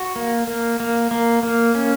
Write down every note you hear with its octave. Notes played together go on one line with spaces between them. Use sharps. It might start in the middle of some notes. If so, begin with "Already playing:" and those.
Already playing: F#4
A#3
A#3
A#3
A#3
A#3
C#4